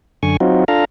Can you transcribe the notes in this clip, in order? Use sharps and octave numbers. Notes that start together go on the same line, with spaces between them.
F#2 D3 G#5 C#6
F#3 C4 D#4 F4 F#4
D4 F4 A4 F5 A#5